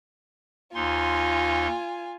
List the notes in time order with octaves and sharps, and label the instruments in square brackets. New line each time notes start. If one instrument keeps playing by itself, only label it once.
[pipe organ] D#2 D#4 C6 [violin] F4 G#5